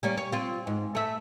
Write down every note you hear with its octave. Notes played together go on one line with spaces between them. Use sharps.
G3 A#3 C#4
C#5
C4 F4
G#2
A3 E5